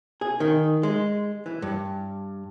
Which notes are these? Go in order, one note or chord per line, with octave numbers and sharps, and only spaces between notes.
G#4
D#3
G#3
E3
G2